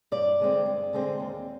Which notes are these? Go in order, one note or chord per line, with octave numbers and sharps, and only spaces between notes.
G2 D5
D3 G#3 C4
G2
D3 G#3 C4
D#2